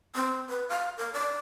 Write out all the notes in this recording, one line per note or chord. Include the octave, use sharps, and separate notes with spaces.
C4
B4
F5
A#4
D5